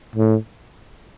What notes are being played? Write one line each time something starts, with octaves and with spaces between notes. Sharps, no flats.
A2